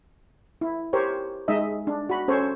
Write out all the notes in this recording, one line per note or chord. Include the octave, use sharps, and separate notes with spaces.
E4
G4 A#4 C5 C#5
G#3 D#4 D#5 E5
D4
F#4 B5
C#4 A4 C5 C#5